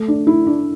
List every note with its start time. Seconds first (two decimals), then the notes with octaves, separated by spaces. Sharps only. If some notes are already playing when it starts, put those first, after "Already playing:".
Already playing: A3
0.08 D4
0.27 E4
0.47 D4